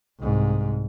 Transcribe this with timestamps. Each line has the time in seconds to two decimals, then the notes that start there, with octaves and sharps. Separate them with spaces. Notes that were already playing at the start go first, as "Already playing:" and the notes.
0.20 C2 G#2